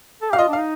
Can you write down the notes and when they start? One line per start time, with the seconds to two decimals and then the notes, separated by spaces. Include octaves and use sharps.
0.22 A4
0.31 G4 F5
0.38 F4 D#5
0.48 D4 F5
0.59 D#4